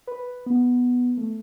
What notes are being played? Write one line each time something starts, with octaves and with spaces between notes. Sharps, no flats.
B4
B3
A3